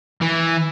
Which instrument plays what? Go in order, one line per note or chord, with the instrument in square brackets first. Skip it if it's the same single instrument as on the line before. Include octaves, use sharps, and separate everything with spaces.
[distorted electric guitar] E3